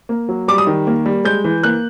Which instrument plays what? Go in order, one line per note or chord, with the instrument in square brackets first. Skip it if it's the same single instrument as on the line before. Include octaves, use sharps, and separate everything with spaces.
[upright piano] A#3
F#3
G3 D6
D#6
D#3
A#3
G3
G#3 G6
E3
A#3 F#6